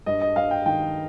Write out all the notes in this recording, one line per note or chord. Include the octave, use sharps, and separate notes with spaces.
G2 D#5
D#5
G2 F5
G5
D#3 G5